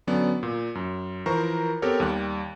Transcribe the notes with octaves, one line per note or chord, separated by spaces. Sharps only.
D3 F#3 B3 C#4 D5
A#2
F#2
E3 F3 A#4 C5 A#5 C#6
B3 C4 G4 A4 A#4 C#5
D#2 G3 F#6